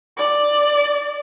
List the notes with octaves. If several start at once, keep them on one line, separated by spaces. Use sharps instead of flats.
D5